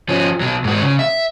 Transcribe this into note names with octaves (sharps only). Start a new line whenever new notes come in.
F3 C#4
B2 F#3
G#2 F#4
C#3
E5